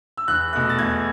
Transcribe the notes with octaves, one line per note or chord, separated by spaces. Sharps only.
E6
E2 F#6
B2 A3 F#6
A6
E2 G#6